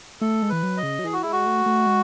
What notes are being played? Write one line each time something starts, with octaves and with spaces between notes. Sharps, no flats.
A3 A4
G#3
E3 B4
F#3
D#5
C#3
F#3
E3 G#4
F#4
G#3 E4
F#4
A3
A3
G#3